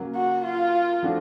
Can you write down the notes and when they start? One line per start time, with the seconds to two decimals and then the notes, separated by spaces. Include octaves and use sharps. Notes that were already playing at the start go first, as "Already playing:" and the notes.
Already playing: C#3 F#3 A#3
0.15 F#4
0.44 F4
1.03 F3 A3 D4 F#4